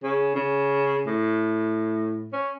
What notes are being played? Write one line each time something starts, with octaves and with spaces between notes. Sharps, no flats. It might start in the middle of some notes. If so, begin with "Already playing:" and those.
C#3
C#3
A2
C#4